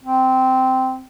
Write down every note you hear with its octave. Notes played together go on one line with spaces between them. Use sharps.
C4